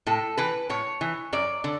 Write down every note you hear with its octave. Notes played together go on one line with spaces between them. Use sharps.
A2 A4
E3 B4
A2 C#5
E3
F#2 D5
D3